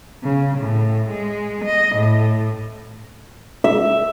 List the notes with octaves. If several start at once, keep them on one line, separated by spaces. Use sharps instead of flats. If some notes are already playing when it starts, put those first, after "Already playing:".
C#3
A2
G#3
D#5
A2
E5